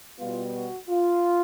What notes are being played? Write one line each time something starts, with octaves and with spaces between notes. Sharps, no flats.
B2 G3 B3 F4
F#4
F4